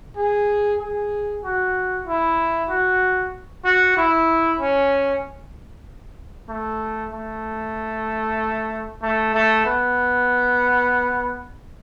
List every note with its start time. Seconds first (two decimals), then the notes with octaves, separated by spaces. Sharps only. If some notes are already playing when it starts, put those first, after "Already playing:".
0.17 G#4
0.80 G#4
1.44 F#4
2.07 E4
2.69 F#4
3.65 F#4
3.97 E4
4.60 C#4
6.49 A3
7.13 A3
9.02 A3
9.34 A3
9.65 B3